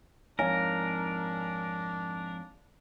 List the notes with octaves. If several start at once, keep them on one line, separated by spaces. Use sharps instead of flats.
F2 G#2 D4 A#4 C#5 F5 G#5